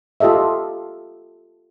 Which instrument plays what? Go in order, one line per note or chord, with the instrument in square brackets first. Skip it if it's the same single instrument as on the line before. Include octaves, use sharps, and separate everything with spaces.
[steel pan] F4 G4 A4 D#5 E5